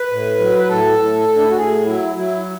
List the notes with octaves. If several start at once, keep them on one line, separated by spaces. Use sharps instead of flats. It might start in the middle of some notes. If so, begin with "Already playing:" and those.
Already playing: B4
A2
F#3
B4
A2 A4
A2
A2
D4
E4
F#4
A2 G#4
F#3 E4
F#3 E4